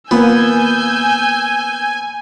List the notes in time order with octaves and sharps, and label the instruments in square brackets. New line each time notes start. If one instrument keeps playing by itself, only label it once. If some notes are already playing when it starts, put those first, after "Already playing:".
[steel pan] A#3 F4 [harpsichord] B3 [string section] G#5 [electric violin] E6 G6